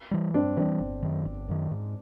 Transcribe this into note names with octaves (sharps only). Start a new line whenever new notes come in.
E3 G3
G2 C4 D4
E3 G3 C4 D4
G1
F#2 D#3
G1
F#2 D#3
G#2